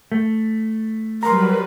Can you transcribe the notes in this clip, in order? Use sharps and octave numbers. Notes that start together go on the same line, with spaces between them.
A3
F#3 G3 A#4 B4 A#5 C6